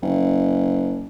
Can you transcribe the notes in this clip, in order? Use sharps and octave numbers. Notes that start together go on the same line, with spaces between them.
F#1